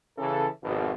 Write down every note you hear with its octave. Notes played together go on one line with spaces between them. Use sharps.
C#3 E3 A4
G#1 F2 B2